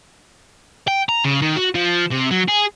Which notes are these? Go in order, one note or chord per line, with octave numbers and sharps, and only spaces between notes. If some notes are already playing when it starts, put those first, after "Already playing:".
G5
A#5
C#3
D#3
F#4
F3
C3
F#3
G#4